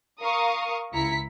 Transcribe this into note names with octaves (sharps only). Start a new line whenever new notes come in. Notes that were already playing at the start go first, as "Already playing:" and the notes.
A#4 F5 A#5 C#6 D#6
C#2 E4 A#5 B6 C#7